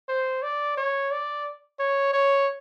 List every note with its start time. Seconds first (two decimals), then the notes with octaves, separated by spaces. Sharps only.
0.08 C5
0.43 D5
0.77 C#5
1.11 D5
1.80 C#5
2.13 C#5